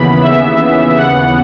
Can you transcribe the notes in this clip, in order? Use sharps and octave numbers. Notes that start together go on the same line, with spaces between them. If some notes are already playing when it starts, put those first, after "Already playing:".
Already playing: D#2 C#3 E3 B3 B5
E5
F#5